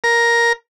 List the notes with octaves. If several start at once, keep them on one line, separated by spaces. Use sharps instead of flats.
A#4